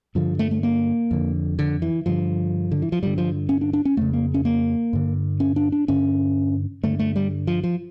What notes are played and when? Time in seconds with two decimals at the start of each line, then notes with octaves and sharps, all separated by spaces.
0.15 G2 D3 F3
0.39 A3
0.51 A3
0.63 A#3
1.11 F2 D3
1.59 D3
1.82 E3
2.06 G2 D3 F3
2.71 D3
2.82 E3
2.92 F3
3.02 G2 D3 G3
3.18 F3
3.49 C#4
3.61 D4
3.73 D4
3.85 C#4
3.97 F2 C#3 A3
4.13 A#3
4.34 C#4
4.45 A#3
4.93 G2 D3
5.40 C#4
5.56 D4
5.72 D4
5.88 G2 D3 C#4
6.83 G2 D3 A3
6.99 A3
7.16 G3
7.47 F3
7.64 F3